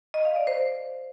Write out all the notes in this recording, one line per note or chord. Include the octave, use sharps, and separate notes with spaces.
D#5
F5
D5
C5